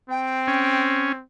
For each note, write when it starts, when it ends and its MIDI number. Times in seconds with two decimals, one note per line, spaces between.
0.10 1.22 60
0.10 0.84 79
0.47 1.12 61